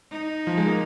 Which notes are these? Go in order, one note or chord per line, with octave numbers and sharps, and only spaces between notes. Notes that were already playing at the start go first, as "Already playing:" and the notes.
D#4
F3
G#3
A#3